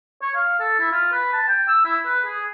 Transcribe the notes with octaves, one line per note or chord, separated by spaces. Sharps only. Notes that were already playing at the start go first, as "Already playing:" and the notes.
C#5
F5
A4
E4
F4
B4
A5
G5
E6
E4
B4
G#4